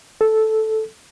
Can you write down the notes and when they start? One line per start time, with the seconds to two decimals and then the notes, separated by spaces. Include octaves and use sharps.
0.21 A4